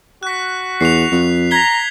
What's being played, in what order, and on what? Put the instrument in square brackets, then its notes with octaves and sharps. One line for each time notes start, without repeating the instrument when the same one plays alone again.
[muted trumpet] F#4 [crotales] F#6 B6
[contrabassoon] E2 [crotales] C7 F7
[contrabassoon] F2
[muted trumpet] A#5 [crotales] G#6 B6 G7